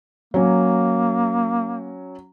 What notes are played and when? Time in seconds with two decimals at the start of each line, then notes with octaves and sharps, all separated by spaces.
0.34 F#3 A#3 C#4